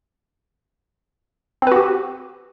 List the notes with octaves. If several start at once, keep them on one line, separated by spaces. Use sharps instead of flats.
C4 F#4 G4 B4